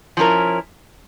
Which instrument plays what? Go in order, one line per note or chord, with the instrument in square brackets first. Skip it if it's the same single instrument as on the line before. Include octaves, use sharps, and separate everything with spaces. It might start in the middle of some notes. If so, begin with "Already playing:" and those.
[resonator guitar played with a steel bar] F3 C#4 E4 A#4